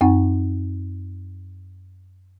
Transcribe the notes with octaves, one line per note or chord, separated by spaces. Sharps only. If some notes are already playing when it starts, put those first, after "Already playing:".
F#2 C4 D#4 F#5